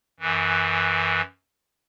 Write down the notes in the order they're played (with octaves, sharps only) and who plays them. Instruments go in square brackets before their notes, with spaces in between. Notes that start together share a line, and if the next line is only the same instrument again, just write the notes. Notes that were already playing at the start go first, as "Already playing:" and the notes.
[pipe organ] F#2 E3